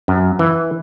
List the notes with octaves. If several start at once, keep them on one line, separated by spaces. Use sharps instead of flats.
F#2
E3